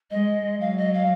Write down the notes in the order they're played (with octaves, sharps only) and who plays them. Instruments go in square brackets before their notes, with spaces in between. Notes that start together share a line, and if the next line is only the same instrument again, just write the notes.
[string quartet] G#3 [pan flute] D#5
[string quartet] F#3 [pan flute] F5
[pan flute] D#5
F5